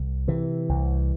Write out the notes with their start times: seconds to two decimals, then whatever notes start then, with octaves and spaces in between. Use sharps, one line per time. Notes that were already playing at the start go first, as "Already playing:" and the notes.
Already playing: C2
0.28 C3 E3
0.69 C2